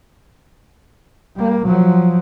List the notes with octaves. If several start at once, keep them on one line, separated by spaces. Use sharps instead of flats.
G3 A#3
F3 F#3